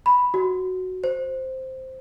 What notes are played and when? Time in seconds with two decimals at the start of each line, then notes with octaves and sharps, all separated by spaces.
0.06 B5
0.34 F#4
1.04 C5